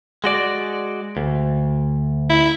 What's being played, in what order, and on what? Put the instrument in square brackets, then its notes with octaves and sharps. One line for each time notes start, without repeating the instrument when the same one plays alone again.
[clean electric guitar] G#3 F#4 D5
D2
[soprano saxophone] E4